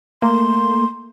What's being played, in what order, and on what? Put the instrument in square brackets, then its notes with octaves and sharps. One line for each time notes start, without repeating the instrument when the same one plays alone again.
[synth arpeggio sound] A3 A#3 [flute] C6